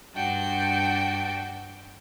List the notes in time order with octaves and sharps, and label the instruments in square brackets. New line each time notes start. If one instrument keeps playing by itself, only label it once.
[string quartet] G2 D4 F#4 G5